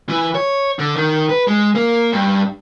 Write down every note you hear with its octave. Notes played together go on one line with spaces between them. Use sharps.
E3
C#5
D3
D#3
B4
G#3
A#3
G2